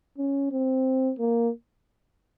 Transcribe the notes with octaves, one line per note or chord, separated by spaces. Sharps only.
C#4
C4
A#3